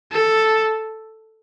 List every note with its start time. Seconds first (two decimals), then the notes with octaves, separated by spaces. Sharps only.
0.12 A4